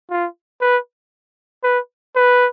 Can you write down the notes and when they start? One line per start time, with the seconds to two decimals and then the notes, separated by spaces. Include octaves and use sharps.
0.10 F4
0.61 B4
1.64 B4
2.16 B4